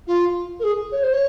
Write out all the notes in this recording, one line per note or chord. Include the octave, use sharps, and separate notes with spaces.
F4
A#4
G#4
C#5
C5
C#5